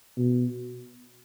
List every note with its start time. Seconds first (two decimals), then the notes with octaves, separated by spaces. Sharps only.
0.17 B2